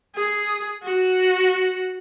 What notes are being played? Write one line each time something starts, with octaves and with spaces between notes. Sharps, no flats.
G#4
F#4